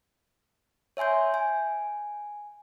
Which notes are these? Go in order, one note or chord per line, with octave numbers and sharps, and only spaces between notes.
C#5 E5 G#5 C6 G6
G#5